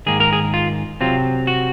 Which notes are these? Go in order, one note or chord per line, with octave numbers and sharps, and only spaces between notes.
G#2 D#3 A#3 G#4
A#4
G#4
F4
C3 F#3 C4 F4
F#4